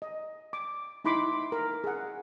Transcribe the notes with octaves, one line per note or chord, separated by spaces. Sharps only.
D#5
D6
D#4 E4 B5 C6 D6
A#4
G#4 F#5